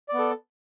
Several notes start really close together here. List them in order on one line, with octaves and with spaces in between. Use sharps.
D5 B3 A4